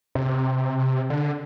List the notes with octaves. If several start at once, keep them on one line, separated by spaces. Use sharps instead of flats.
C3
D3